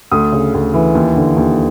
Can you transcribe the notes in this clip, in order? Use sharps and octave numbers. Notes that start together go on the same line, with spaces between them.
D2 D#6
C#3
D2
E3
D#2
D3
D#2